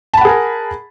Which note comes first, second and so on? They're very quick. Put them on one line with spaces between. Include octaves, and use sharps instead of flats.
A5 B5 F#5 G#4 A#4